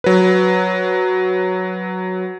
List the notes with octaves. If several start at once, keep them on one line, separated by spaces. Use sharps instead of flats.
F#3 B4